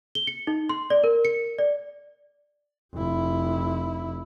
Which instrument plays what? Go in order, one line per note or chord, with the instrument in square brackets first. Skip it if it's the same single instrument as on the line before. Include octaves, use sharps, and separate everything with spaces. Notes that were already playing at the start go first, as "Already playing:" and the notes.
[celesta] G7
C#7
D#4
C6
D5
A#4
C#7
D5
[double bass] F1 E4